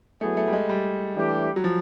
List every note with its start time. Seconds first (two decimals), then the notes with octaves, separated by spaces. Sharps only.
0.21 F#3 A3 B3 E4 G#4
0.37 A3
0.48 G3
0.53 G#3
0.69 G3
1.16 E3 A3 D4 G4
1.56 F#3
1.64 F3